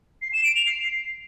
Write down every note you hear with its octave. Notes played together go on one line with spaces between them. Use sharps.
C7
E7
D7
F7
C7